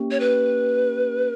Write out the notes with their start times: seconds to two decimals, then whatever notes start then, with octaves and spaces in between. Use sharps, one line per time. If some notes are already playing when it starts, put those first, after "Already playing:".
Already playing: A#3 C#4 G4
0.11 C#5
0.20 B4